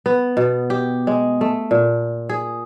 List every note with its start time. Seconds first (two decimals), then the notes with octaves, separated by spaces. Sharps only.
0.06 B3
0.37 B2
0.70 G4
1.07 G#3
1.41 A3
1.71 A#2
2.29 G#4